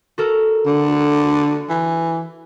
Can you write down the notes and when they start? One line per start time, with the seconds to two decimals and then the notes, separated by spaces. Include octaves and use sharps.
0.18 F#4 A4 A#4
0.66 D3
1.69 E3